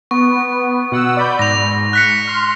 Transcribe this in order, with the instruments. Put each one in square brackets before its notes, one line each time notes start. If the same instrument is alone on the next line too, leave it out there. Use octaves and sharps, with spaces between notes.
[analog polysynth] B3 [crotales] C#6
[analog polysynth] B2 F#5 E6
D5 B5 G6
[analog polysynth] G#2 [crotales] A#6 F7
[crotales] F#6 B6 C#7
[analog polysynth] C6 F6